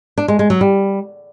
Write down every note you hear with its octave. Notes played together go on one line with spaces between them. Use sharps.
D4
G#3
G#3
F#3
G3